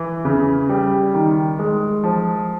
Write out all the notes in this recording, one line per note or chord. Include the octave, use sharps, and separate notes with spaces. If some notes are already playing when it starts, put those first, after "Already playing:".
Already playing: E3
C#3
G3
D#3
G#3
F3